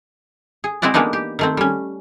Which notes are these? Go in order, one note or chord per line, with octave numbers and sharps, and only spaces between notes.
G#4
G#3 C4 E4 F#4 D5
E3 G#3 A#3 B3 D4 D#4
G4
D#3 A3 C4
G3 C#4